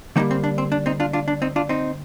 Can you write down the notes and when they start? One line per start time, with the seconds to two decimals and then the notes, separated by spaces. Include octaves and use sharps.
0.16 D3 G3 A#3 C4 D#4
0.31 C4
0.44 D4
0.58 C4
0.72 D4
0.86 C4 D#4
1.00 D4 F4
1.13 D4 F4
1.28 D4
1.42 C4 D#4
1.56 D4 F4
1.69 C4 D#4